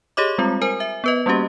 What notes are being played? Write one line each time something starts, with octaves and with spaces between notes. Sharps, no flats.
G4 G#4 C#5 D#5 D6
G3 G#3 C4 F4
A#4 C5 G#5
E5
B3 B4 D#5
G3 A#3 C#4 F#4 G4